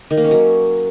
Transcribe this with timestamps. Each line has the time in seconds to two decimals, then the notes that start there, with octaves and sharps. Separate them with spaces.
0.10 D#3
0.17 A#3
0.24 C#4
0.31 F#3